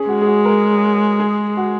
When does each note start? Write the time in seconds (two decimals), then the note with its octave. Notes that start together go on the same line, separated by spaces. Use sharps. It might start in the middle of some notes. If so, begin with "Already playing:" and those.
Already playing: C#4 G#4
0.08 G#3 F#4
0.22 G#4
0.27 F#4
0.45 A#4
1.20 G#4
1.57 F#4